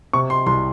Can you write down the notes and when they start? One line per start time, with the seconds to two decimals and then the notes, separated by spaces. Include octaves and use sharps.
0.13 C3 C#6
0.30 C6
0.46 C2 C6